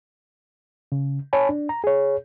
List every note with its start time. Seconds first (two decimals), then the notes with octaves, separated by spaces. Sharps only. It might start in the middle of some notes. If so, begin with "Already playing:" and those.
0.92 C#3
1.33 C#5 G#5 A5 B5
1.49 D4
1.69 A#5
1.84 G#4 C#5